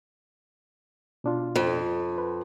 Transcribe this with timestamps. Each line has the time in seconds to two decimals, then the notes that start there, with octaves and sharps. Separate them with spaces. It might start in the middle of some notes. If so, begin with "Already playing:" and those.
1.24 B2 D4 F4
1.56 F2
2.18 B4